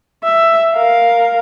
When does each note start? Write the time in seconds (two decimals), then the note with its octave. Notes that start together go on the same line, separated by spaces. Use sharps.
0.24 E5
0.74 A#4 F5